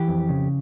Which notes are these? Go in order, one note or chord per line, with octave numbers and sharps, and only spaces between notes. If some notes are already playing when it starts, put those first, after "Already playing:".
Already playing: E3 G4
F2
C#3